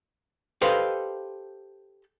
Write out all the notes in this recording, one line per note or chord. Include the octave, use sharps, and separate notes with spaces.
G4 A4 B4 C5 D#5 F5